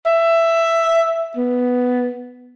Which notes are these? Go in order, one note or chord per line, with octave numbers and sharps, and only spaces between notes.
E5
B3